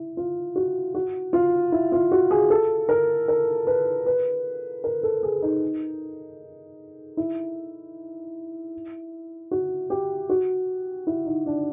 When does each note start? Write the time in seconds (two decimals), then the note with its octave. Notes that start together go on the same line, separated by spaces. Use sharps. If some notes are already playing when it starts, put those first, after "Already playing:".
Already playing: E4
0.17 F4
0.56 F#4
0.95 F#4
1.33 F4
1.72 E4
1.92 F4
2.12 F#4
2.31 G#4
2.50 A4
2.89 A#4
3.28 A#4
3.67 B4
4.06 B4
4.84 A#4
5.03 A4
5.23 G#4
5.42 D#4
7.17 E4
9.51 F#4
9.90 G4
10.30 F#4
11.07 E4
11.26 D#4
11.46 D4